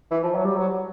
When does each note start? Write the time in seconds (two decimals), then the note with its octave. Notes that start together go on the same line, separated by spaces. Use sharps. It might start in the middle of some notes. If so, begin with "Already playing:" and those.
0.11 E3
0.24 F3
0.35 F#3
0.45 G3
0.56 F#3